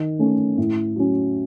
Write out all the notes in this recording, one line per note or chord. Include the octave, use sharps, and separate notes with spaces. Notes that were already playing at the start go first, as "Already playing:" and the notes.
Already playing: D#3
A3 C#4
A2
F#3 C#4